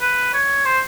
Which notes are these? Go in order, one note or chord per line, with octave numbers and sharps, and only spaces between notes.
B4
C#5
C5